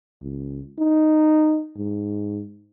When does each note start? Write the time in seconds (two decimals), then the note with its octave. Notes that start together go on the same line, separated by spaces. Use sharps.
0.22 C#2
0.78 D#4
1.77 G#2